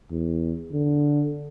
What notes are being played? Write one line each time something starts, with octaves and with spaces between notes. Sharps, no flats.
E2
D3